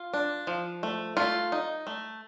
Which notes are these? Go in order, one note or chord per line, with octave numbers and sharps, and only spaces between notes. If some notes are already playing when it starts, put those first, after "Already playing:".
Already playing: F4
D4
F3
A3
A3 F4
D#4
A3